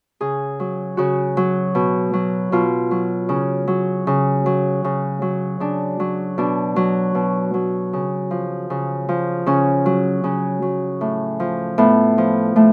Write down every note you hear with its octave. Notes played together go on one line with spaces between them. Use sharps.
C#3 G#4
F#3
C#3 F#4
F#3
B2
F#3
B2 F4
F#3
C#3 C#4
F#3
C#3
F#3
C#3
F#3
C#3 D4
F#3
B2 D4
F#3
B2
F#3
C#3
F3
C#3
F3
C#3 C#4
F#3
C#3 C#4
F#3
A2
F3
A2 B3
F3
A2 A3